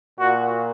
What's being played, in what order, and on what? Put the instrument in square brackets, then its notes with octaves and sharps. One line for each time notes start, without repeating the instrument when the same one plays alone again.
[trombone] A#2 [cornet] F#4